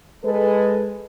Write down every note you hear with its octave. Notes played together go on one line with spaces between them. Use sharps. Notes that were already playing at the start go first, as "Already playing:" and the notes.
G#3 A4 B4